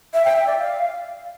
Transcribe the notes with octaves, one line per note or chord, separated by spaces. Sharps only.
E5
G5
E5
D5
F5